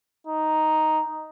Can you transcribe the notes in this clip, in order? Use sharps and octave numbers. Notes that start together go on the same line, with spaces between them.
D#4